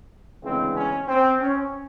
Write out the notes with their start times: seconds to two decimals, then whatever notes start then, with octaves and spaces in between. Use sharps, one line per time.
0.42 D2 C#3 E3 G#3 B3 C4
0.75 C#4
1.08 C4
1.40 C#4